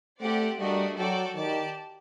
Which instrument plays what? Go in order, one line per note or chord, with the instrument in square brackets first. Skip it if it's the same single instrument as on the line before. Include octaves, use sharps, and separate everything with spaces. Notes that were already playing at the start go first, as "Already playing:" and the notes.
[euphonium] A3 [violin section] C4 G4 D5 F#5
[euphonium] G3 [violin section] A3 D4 F#4 A#4 D#5
[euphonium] F#3 [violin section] F#4 A4 D5 G5
[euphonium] D#3 [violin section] G4 D5 A5